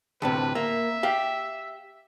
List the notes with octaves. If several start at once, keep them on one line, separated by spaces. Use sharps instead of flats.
D2 A2 C3 B4
A#3 E5
G4 F5